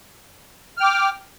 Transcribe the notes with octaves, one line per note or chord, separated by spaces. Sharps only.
G5 D6 F6